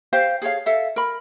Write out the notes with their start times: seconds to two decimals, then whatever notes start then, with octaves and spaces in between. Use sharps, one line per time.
0.13 G4 C5 F5
0.42 G#4 A4 C#5 F5
0.66 A4 E5 F5
0.96 A#4 B5